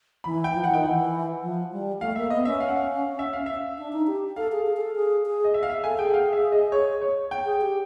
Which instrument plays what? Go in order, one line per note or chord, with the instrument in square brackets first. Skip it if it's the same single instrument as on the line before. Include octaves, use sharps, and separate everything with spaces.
[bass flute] E3 [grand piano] B5
[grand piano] G5
[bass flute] F3
[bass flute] E3 [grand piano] F#5
[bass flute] D#3 [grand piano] G5
[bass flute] E3 [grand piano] F#5
[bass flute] F3
G3
[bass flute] A3 [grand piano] F5
[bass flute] A#3 [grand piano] E5
[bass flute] B3 [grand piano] D#5
[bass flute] C#4 [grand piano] E5
[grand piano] F5
F#5
F5
E5
F5
E5
[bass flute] D4
D#4
G4
[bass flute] A4 [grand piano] F5
[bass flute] G#4
G#4
G#4
A4
G#4
G#4
[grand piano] D#5
E5
F5
E5
[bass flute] A4 [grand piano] G#5
[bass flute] G#4 [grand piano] G5
[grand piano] F#5
F5
E5
D#5
C#5
C#5
G5
[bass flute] G#4
G4